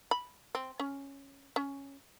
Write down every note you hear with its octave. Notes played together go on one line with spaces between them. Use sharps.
B5
C4
C#4
C#4